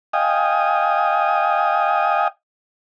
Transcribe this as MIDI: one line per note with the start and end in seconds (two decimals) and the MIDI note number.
0.13 2.28 75
0.13 2.28 77
0.13 2.28 79
0.13 2.28 80
0.13 2.28 87